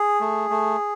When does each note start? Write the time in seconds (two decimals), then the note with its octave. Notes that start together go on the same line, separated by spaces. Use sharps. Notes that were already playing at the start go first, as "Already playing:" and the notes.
Already playing: G#4
0.21 A3
0.50 A3